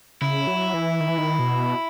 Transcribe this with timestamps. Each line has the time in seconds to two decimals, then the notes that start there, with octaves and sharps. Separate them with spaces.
0.21 C#3 E4
0.47 F#3
0.74 E3
1.00 D#3
1.09 E3
1.18 D#3
1.39 B2